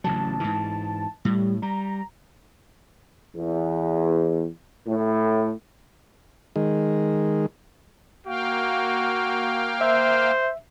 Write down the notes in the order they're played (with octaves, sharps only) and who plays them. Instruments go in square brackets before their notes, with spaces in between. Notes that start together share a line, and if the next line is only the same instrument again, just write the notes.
[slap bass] A1 C#3 F#3 [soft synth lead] A5
[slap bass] G#2 E3
[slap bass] A2 [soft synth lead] G3
[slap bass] G3 [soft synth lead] A#5
[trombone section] E2
A2
[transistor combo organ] D#3 G#3
[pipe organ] A#3 F5 G5 [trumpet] F#4
[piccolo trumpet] C5 [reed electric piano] E5